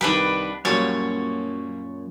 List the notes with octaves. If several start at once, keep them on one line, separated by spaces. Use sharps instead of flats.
C2 D#3 D4 B4 B5
F#2 A#2 F#3 G3 A#3 C#5 A5